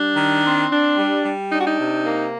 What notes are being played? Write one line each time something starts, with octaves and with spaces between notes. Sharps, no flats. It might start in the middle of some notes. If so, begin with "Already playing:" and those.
Already playing: G3 D4
D#3
C4
D4
G3
G3
D4 D#4
F#4
D#4
C3
A#3